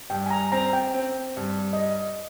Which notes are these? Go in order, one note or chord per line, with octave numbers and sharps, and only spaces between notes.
G2 G5
G#5
A#5
C4 A#5
G5
C4
G2
D#5